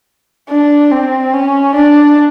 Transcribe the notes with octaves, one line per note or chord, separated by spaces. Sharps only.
D4
C4
C#4
D4